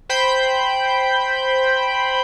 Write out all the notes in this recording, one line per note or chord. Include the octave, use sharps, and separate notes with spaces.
C5 G5 B5 G6